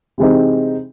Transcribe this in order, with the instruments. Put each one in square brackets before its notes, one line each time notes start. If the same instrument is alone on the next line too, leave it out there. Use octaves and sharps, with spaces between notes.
[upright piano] C3 E3 G#3 C4 D#4